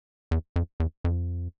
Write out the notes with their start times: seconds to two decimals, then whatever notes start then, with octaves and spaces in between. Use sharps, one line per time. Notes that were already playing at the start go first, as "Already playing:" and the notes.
0.31 E2
0.56 F2
0.80 E2
1.04 F2